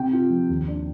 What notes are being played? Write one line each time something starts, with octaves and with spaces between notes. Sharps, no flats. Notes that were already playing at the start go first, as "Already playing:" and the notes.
Already playing: C3 G5
F4
F3
D#2
D4